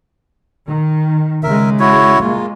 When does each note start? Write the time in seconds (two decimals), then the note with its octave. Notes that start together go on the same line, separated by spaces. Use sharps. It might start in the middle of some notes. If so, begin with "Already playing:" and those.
0.67 D#3
1.43 C#3 G#3 A#4 E5
1.80 E4 F#4 C#5
2.20 G#3 A#3 F4